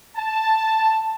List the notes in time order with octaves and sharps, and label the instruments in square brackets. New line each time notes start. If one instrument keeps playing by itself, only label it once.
[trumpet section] A5